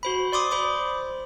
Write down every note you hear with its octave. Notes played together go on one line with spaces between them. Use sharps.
F#4 C5 B5
D5 C6 D6 D#6
C5 B5 D6